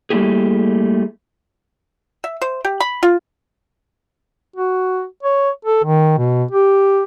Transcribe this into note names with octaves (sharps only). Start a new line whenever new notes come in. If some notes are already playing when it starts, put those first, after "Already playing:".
G3 A3 A#3 E4 G4 G#4
E5
C5
G4
B5
F4
F#4
C#5
A4
D#3
B2
G4